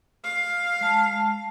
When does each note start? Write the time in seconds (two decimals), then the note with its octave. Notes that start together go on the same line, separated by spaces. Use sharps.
0.24 F5
0.81 G#3 A5